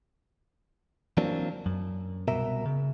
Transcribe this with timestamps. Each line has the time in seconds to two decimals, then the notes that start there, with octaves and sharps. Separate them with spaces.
1.17 E3 F#3 A#3 C4 D4
1.66 F#2
2.28 C2 B2 A#4 E5
2.66 C#3